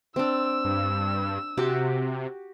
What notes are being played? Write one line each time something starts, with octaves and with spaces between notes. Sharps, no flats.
C4 D4 E6
G2
C3 F#4 G4